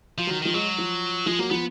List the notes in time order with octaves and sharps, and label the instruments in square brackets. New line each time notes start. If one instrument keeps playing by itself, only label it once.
[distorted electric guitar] F3 [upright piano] F4
[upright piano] F#3
[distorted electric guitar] D#3
[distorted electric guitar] D#3 [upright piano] F3
[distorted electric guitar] F#3 [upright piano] G#3
[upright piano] F3
[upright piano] F3 [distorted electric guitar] G#3
[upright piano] F#3 [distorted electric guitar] A#3
[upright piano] F3 [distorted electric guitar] B3